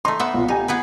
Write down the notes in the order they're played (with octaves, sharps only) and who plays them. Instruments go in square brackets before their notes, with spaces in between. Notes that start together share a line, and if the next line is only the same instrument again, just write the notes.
[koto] A3 D#4 [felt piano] C6
[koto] B3 E5
[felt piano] B1 A#2
[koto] D#4 [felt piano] G4 G#5
[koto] B3 G#4 B4